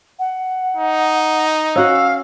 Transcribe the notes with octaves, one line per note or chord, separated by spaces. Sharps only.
F#5
D#4
C#4 F#4 F5 F#5 E6